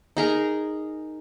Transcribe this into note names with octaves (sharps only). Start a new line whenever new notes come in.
D#4 G#4 A#4